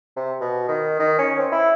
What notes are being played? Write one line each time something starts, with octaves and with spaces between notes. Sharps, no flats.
C3
B2
D#3
D#3
C#4
C4
E4